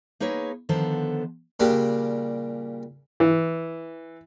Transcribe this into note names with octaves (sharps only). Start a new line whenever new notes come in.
A#3 D#4 G#4 B4 C#5
D3 D#3 F3 B3 A4 C5
A#2 C#3 G3 D4 G4
E3